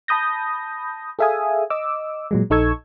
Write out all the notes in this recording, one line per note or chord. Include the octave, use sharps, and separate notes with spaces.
A5 B5 D#6 G6 A#6
G#4 A4 E5 F5 G#5 D#6
D#5 D6 E6
A#2 F#3 G#3
A#1 D#4 A4 C#6 E6 G#6